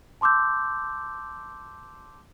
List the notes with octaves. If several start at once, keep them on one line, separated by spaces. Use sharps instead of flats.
A5 C6 D6 E6 G6